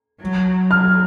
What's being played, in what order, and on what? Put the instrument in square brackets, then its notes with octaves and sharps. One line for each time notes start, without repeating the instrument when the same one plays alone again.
[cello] F#3
[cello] F#3 [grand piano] F6